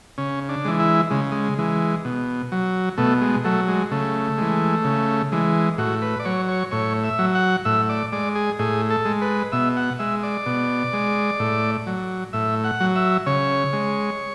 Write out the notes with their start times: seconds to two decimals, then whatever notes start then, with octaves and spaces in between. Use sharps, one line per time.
0.18 C#3 C#4
0.49 D4
0.65 E3 G#3
0.79 E4
1.10 C#3 G#3
1.32 G#3
1.58 E3 G#3
2.05 B2
2.52 F#3
2.97 B2 A3
3.22 G#3
3.44 F#3 A3
3.68 G#3
3.91 C#3 A3
4.38 E3 G#3
4.84 C#3
5.32 E3 G#3
5.78 A2 F#4
6.02 B4
6.20 D5
6.25 F#3 C#5
6.48 C#5
6.71 A2 C#5
7.04 E5
7.19 F#3
7.35 F#5
7.65 A2 E5
7.89 D5
8.13 G#3 D5
8.35 G#4
8.59 A2 G#4
8.90 A4
9.05 G#3
9.22 B4
9.52 B2 E5
9.77 F#5
9.99 G#3 E5
10.23 D5
10.46 B2
10.93 G#3
11.40 A2
11.87 F#3
12.33 A2 E5
12.64 F#5
12.80 F#3
12.95 E5
13.26 C#3 C#5
13.73 G#3